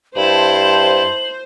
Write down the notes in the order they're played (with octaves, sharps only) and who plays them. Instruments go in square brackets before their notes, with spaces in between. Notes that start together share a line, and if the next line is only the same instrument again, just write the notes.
[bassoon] G2 [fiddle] E4 A5 [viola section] C5 [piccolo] F#7